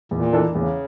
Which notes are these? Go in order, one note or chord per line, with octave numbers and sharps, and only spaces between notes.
E2 A#2
E3 A#3 D4 A4
E2 C#3